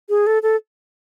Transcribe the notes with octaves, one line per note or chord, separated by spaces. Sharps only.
G#4
A4
A4